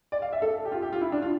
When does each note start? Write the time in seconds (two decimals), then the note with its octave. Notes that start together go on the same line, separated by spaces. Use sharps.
0.12 D5
0.22 F5
0.33 E5
0.42 A4
0.65 G4
0.72 F4
0.82 G4
0.93 F4
1.02 E4
1.12 D4
1.22 F4